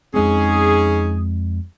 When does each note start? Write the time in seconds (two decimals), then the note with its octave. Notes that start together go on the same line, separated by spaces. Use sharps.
0.14 F2 G#3 C4 C#4 D#4 G#4